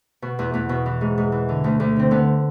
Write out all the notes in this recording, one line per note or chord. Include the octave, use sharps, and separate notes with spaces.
B2
E2
E2 B3
B2
E3
G#2
G#2
E3
D3
D2
D2
D3 C4
D3 B3